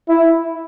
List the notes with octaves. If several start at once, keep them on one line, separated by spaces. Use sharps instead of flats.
E4